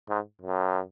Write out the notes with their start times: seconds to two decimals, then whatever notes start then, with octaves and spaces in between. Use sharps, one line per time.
0.09 G#2
0.42 F#2